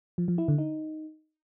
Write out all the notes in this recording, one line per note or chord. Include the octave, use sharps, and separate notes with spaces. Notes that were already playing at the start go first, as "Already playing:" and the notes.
F3
F3
E4
D3
D#4